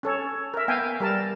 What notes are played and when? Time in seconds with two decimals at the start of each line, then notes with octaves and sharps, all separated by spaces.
0.03 C#4 A4 C#5
0.54 A#4 E5
0.68 B3 F5 G5 G#5
1.00 G3 A#4 A5